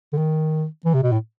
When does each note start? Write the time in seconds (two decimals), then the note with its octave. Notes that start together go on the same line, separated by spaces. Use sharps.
0.13 D3
0.17 D#3
0.85 E3
0.94 C3
1.03 B2
1.12 A2